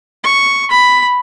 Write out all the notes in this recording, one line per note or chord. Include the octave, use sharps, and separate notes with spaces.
C#6
B5